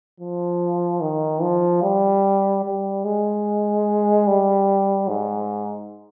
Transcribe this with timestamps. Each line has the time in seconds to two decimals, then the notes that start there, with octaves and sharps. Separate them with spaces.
0.20 F3
1.01 D#3
1.42 F3
1.83 G3
2.64 G3
3.05 G#3
4.27 G3
5.09 G#2